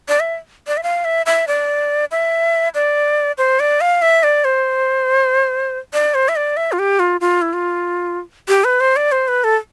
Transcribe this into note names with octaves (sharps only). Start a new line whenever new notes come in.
D5
E5
D5
E5
F5
E5
E5
D5
E5
D5
C5
D5
F5
E5
D5
C5
D5
C5
E5
D5
E5
F4
G4
F4
F4
E4
F4
G4
B4
C5
D5
C5
B4
A4